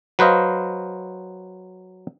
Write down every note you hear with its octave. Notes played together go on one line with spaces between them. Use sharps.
F#3 B4 C5 D#5 F5